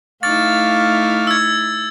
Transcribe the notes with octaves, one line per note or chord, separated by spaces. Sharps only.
A3 D#4 E4 F5 C#6 D6 F6 A6
E6 G#6